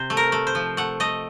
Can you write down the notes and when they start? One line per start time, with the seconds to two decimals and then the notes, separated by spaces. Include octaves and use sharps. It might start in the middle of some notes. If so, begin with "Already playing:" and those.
Already playing: C3 C5
0.10 A3
0.17 A#4
0.32 A3
0.47 C5
0.55 F3
0.77 A3 F#5
1.00 A3 D#5